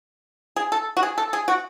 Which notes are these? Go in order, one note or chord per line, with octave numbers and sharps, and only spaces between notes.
G#4
A4
F#4
G#4
A4
G#4
F#4